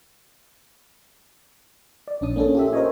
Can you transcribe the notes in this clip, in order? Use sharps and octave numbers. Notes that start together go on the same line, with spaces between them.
D5
A#1 C#4 D4 D#6
A#3 C#4 A4
F4 G4 E5
A#4 C5 C#5 D#5 G#5